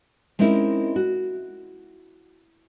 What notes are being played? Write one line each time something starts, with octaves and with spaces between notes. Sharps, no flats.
G#3 C4 C#4 D#4 E4 A#4
F#4